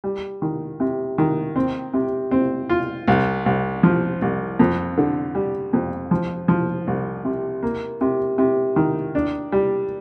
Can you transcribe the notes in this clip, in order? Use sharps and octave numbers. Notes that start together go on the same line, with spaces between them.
G3
D#3
C3
D#3
C4
C3
C4
F4
C2
C2
F3
C2
F2
D3
G3
F2
F3
F3
C2
C3
A#3
C3
C3
D#3
D4
G3